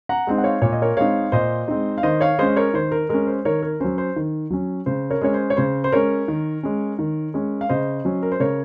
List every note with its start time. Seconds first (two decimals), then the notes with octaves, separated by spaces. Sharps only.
0.09 F#5 A#5
0.27 G#3 C4 D#4
0.38 F#5
0.44 C#5 F5
0.62 A#2 C#5
0.73 D#5
0.82 A#4 C#5
0.97 G#3 C4 D#4 C#5 F5
1.32 A#2 C5 D#5
1.68 G#3 C4 D#4
1.98 F5
2.03 D#3 C5 D#5
2.21 C#5 F5
2.39 G#3 C#4 C5 D#5
2.56 A#4 C#5
2.74 D#3 C5
2.92 A#4
3.09 G#3 C#4 A#4
3.27 C5
3.45 D#3 A#4 C#5
3.63 A#4
3.80 F#3 C#4 C5
3.98 C5
4.16 D#3
4.50 F#3 C#4
4.86 C#3 C5
5.10 A#4 C#5
5.21 G#3 C#4 C#5
5.34 C5
5.50 C#5
5.57 C#3 C5
5.84 C5
5.92 G#3 C#4 A#4 C#5
6.28 D#3
6.63 G#3 C#4
6.99 D#3
7.34 G#3 C#4
7.61 F5
7.69 C#3 C5 D#5
8.05 F#3 C#4
8.23 A#4
8.32 C5
8.40 C#3 A#4 C#5